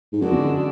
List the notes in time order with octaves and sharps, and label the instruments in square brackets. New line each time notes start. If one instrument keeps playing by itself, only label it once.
[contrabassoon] G#2
[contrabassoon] F#2 [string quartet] D3 G#3 D4 F#4
[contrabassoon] E2
F#2